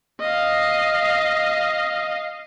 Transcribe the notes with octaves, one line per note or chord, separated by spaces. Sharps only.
D#5 F5